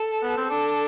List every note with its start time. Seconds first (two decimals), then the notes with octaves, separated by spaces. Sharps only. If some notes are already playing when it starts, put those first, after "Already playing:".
Already playing: A4
0.23 B3
0.37 C4
0.50 D4 A4